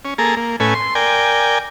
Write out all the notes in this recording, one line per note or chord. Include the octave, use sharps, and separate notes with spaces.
C#4
A#3 G#4 A4 A#5
A#3
A2 A3 C#4 B4 G#5
C6
A#4 D5 G5 G#5